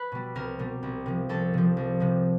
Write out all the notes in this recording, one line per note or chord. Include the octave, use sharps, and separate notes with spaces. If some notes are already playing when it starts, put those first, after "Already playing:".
Already playing: B4
B2 G3
C2 A#4
B2 G3
C2
C3 F3
C2 A4
C3 F3
C2
C3 F3